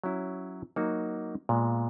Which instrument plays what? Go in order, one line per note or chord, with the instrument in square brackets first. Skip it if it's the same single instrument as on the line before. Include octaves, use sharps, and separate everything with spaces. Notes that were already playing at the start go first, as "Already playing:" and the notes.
[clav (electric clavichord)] F#3 C#4 E4
F#3 A#3 D#4 F#4
A#2 G#3 B3